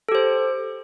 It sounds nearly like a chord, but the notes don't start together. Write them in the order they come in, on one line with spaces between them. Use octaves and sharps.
A4 G4 C5